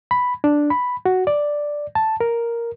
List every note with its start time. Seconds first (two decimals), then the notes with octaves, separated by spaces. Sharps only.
0.11 B5
0.44 D4
0.70 B5
1.05 F#4
1.27 D5
1.95 A5
2.20 A#4